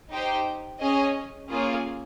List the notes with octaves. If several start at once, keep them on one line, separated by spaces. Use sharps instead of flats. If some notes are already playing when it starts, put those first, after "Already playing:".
D#4 G4 C5 G5
C#4 G#4 D#5 G#5
A#3 C#4 F4 G#4